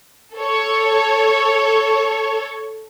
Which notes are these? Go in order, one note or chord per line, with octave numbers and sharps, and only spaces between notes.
A4 C#5